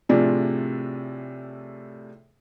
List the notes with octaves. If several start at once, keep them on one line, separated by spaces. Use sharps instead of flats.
A2 C3 F3 D4 G#4